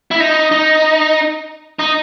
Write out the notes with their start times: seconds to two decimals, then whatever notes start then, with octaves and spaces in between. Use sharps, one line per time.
0.11 E4
0.20 D#4
0.52 D#4
1.79 D#4